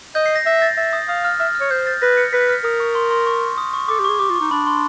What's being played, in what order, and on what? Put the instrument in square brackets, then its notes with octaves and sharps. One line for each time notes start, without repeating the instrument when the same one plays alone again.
[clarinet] D#5 [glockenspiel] G6
[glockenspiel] C7
A#6
[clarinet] E5 [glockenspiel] A#6
[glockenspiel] A6
[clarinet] E5 [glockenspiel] A6
[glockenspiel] D#6
[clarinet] F5 [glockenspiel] D#6
[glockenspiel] F6
[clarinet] E5 [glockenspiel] F6
[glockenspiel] F6
[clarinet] C#5
[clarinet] C5 [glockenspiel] G6
[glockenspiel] A6
[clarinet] B4 [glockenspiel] A#6
[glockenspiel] C#7
[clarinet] B4 [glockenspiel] B6
[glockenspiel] F6
[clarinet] A#4 [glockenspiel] D#6
[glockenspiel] C#6
C6
C6
C#6
D#6
C#6
[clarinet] A4 [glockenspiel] D6
[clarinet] G4
[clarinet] G#4 [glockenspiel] C#6
[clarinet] G4 [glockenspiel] D6
[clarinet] F4
[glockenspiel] C#6
[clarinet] D#4
[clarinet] D4 [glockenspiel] B5
[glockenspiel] C6